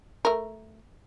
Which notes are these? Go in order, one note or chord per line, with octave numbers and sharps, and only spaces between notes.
A3 A#4